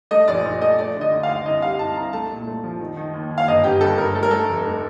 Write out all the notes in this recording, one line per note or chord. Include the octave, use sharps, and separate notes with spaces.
A3 D#5
A#1 D5
A#1
A3 D#5
A3 D5
D3
D#5
D2
F5
D2
C2 D#5
G3 F5
C2 A5
C2 A#5
A3 A5
A#2
A3
F3
D#3
D#3
D#2
D#2
F5
G1 D#5
G1 G4
G2 A4
G2 A#4
A3 A4
A#4
A3 A4
F1
A3